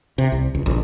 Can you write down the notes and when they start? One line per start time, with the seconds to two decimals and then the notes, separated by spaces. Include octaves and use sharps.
0.18 C3
0.32 C2
0.55 C#2
0.66 A#1